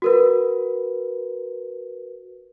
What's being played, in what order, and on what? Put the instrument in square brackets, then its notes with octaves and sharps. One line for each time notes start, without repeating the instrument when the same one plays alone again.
[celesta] F#4 A#4 B4